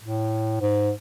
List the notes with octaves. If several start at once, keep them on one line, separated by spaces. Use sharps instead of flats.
A2
G#2